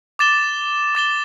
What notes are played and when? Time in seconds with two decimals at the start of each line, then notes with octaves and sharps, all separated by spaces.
0.19 D6 A6 E7 G7
0.95 D6 A6 E7 G7